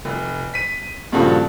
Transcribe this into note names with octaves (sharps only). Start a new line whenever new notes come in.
F1
B6 D#7
G2 A#2 C#3 F3 F#4 A4